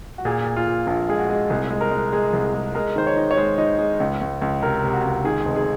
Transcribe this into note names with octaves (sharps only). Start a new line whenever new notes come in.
F#4
A#2 G#4
A#2
F4
A#2
A#1 F4
G#3 G#4
F#4
G#3
C2 G#4
G#3
A#4
G#3
G#3 G#4
C2
G#3
G#3 A#4
D#3 C5
C#5
D#4
C#5
G#3 C5
D#4
G#3
C#2
C#2
C#2
C3 A#4
C3
F#4
C#2
D#3 G#4
F1
G#4